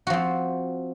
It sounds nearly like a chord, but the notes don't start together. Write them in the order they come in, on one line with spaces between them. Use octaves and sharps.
F#4 F3 C4